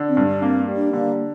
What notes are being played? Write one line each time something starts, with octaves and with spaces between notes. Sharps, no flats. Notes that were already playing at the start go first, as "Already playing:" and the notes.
Already playing: D3
C4
G2
D4
A#3 C4
G3
D4
D3 A#3